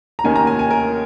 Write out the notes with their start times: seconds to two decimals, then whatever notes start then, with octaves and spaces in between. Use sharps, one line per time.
0.19 A#5
0.24 D#2 D#3 A#3 C#4 G#5
0.36 A#5
0.47 G#5
0.59 G#5
0.71 A#4